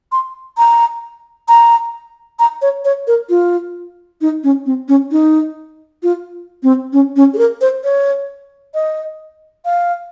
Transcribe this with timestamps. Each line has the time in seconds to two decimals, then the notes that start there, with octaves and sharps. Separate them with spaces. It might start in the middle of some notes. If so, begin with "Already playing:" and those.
0.12 C6
0.58 A#5
1.48 A#5
2.39 A#5
2.62 C#5
2.85 C#5
3.07 A#4
3.29 F4
4.21 D#4
4.44 C#4
4.66 C4
4.88 C#4
5.11 D#4
6.03 F4
6.63 C4
6.93 C#4
7.16 C#4
7.34 G#4
7.38 A#4
7.61 C5
7.84 C#5
8.74 D#5
9.65 F5